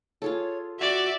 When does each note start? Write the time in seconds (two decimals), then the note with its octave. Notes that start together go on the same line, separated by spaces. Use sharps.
0.22 F4 G#4 A4 C#5
0.79 F#4 D5 E5